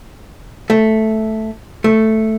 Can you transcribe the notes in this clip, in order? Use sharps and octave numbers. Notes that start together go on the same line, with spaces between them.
A3
A3